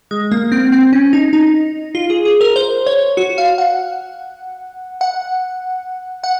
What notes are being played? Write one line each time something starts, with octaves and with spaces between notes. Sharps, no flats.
G#3
A#3
C4
C4
C#4
D#4
D#4
F4
G#4
G#4
A#4
C5
C#5
F#4
F5
F#5
F#5
F#5